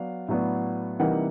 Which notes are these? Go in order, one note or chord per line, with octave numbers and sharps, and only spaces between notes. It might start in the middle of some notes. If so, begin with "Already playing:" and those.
Already playing: F#3 B3 D4 F5
A2 F#3 B3 D4
C3 E3 G3 A#3 D#4 F#5